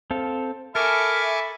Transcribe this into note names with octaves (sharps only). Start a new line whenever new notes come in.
C4 A4 F5
A4 A#4 E5 G#5 B5 C#6 D6